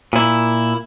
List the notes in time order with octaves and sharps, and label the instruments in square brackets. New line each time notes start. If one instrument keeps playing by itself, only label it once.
[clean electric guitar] A#2 E4